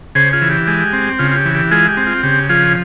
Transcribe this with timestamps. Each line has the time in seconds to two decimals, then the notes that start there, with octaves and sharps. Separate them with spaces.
0.15 C#3 G#4 C5
0.33 F4 G#4
0.42 E3
0.50 G4
0.67 G#3
0.93 C4
1.19 C#3 F4
1.31 F4
1.36 G4
1.45 E3
1.54 G4
1.71 G#3 F4 G#4
1.89 G4
1.97 C4
2.06 F4
2.23 C#3 G4
2.49 F3 F4 G#4